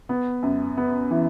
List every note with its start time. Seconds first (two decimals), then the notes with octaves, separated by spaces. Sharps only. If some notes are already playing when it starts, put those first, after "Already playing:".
0.09 B3
0.43 F#2
0.77 B3
1.11 E3